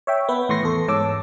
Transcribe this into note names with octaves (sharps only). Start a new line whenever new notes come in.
C#5 E5 G5
B3 B4
A2 E3 C6 C#6 A#6 C7
E2 A4
G#2 C#5 A5 D6 E6